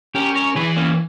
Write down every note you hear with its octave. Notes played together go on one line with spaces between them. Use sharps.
C#4 G4 A#4
A#4 C#5
E3 G#4 B4
A#3 C#4